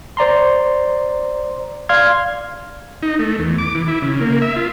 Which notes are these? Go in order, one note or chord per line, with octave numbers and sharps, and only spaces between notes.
C5 D5 A#5 C6
D5 F5 C6 F6 G#6
D#4
A3
E2
D6
E3
E4
C#3
A#3
E5
F4